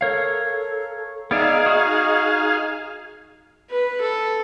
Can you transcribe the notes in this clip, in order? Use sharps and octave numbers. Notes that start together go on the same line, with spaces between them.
A4 A#4 C#5 F5
B3 D#4 G#4 D5 E5 F5
F#4 D#6
B4
A4